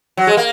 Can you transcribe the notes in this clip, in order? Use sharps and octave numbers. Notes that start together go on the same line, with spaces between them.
F#3
G#3
A#3